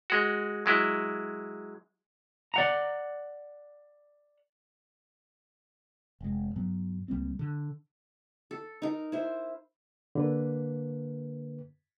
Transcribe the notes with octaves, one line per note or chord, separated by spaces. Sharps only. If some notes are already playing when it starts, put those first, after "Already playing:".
G#3 F#4
F#3 G#3 E4
D5 F#5 A#5
F1 G#3
G2 F#3 B3
C#2 G3 A#3 C4
D3
A4
D#4 A#4
E4 C5
D3 A#3 B4